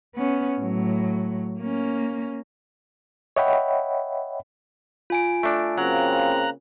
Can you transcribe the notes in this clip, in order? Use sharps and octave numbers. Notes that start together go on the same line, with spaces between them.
B3 C#4
A2 F#3
A#3 C#4
C#5 D#5 E5 F#5 G5 B5
F4 G#5 D7
A3 D4
C#3 F#3 A#3 C4 A#5 F#6